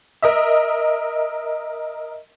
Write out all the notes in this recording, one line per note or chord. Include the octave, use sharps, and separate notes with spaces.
A#4 D#5 E5